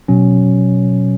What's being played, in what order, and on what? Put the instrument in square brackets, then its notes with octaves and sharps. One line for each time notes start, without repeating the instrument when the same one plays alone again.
[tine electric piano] B2 F#3 C#4